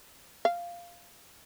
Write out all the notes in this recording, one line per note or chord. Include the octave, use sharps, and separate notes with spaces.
F5